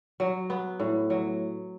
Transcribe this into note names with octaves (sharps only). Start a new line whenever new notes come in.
F#3
B3
A2
F#3